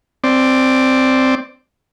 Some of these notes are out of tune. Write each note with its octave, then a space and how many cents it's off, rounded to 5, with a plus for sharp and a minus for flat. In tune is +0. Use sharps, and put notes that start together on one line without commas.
C4 +0 D5 +0